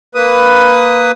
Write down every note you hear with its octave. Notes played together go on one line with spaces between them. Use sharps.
A#3 B4 D#6